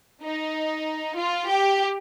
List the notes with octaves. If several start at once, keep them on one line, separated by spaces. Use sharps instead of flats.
D#4
F4
G4